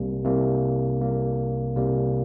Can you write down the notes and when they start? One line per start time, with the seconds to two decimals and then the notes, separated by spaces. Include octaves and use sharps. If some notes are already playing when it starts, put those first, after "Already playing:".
Already playing: C2 C3 G3 A#3
0.25 C2 C3 G3 A#3
1.01 C2 C3 G3 A#3
1.76 C2 C3 G3 A#3